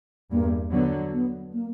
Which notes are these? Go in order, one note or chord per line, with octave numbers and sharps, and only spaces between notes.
E2 G2 A#3
D3 F#3 B3
B3
A#3